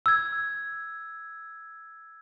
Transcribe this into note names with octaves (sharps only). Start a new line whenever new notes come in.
E6 G#6